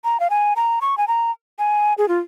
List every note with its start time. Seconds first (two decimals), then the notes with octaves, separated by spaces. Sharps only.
0.04 A#5
0.20 F5
0.30 G#5
0.56 A#5
0.81 C#6
0.98 G#5
1.08 A#5
1.59 G#5
1.98 G#4
2.08 F4